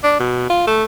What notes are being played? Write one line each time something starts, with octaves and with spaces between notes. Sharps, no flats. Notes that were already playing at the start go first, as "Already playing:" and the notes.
D4
B2
F4
A3